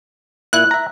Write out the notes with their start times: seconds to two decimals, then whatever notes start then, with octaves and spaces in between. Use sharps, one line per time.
0.53 A#2 E4 F#6
0.71 E5 A#5